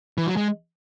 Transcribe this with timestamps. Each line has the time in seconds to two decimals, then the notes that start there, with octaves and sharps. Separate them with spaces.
0.18 E3
0.27 F#3
0.37 G#3